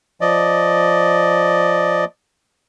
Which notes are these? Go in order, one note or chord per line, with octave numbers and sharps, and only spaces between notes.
F3 D5 D#5